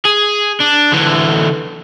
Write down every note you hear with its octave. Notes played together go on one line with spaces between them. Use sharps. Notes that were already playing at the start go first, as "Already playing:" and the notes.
G#4
D4
D3 E3